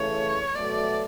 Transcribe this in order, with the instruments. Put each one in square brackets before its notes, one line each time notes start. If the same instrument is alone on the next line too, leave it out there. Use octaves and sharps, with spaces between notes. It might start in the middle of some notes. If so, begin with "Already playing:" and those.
Already playing: [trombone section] C#3 E3 A3 [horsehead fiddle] C#5
[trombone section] B2 F#3 A3 [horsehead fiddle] D5